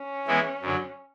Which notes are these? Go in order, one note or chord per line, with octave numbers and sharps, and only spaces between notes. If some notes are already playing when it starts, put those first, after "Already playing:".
Already playing: C#4
E3 G#3 B3 E4
F#2 D3 F#3